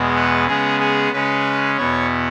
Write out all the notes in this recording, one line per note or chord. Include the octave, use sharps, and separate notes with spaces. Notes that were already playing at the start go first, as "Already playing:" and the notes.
Already playing: E2 B2 G#3 B3
B4
C#3 G#3 B3 G#4
G#4
C#3 G#3 C#4 B4
E2 B2 B3 C#5